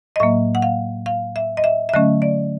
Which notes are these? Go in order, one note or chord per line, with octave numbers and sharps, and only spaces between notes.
D#5
A2 F#3 A#3 E5
F#5
F5
F5
E5
D#5
E5
E5
D3 F#3 A3 C#4 D#5
D5